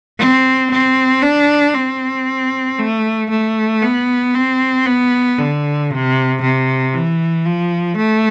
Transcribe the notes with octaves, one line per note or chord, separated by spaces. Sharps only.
C4
C4
D4
C4
A3
A3
B3
C4
B3
D3
C3
C3
E3
F3
A3